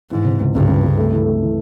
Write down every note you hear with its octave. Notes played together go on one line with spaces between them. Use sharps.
G#2 E3
C3
C#2
C#2 G2
C#2
C#2
A3
E3
A3
E3